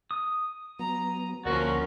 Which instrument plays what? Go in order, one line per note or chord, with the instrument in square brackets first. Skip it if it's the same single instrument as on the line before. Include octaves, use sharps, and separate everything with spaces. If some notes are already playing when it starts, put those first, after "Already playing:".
[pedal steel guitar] D#6
[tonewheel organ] F#3 B3 [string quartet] A#5
[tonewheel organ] D2 A#3 [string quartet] F3 C4 C#4 [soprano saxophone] F#4 [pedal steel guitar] A#4 D5